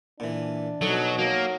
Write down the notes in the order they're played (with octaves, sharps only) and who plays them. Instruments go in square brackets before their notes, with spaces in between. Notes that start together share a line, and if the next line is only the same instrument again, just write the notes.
[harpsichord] A#2 E3 [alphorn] D4
[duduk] B2 [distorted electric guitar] F#3 [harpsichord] D#4 A4
[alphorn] F#3 [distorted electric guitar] A#3